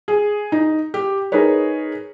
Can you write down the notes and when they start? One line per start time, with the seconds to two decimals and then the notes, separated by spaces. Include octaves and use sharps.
0.08 G#4
0.52 D#4
0.94 G4
1.32 D#4 G#4 A#4 B4 C#5